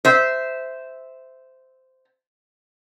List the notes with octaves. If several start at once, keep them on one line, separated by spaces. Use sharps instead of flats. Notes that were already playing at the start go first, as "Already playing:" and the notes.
C5 E5